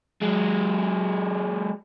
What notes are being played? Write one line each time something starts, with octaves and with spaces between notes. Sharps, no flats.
F#3 G#3